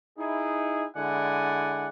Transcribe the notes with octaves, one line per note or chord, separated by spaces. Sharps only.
D#4 E4 G#4
D3 G#3 E4 D5 F#5 G#5